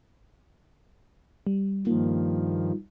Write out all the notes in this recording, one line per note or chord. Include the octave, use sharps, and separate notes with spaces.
G3
G2 D#3 F3 A#3